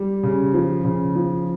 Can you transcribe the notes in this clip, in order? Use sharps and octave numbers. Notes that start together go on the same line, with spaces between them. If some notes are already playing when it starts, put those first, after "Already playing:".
Already playing: G3
C#3
F3
C#3
F3